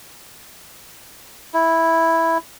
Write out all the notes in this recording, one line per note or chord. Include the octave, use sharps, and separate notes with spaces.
E4